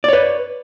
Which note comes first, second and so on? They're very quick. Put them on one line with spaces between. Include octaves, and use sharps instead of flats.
D5 C#5 B4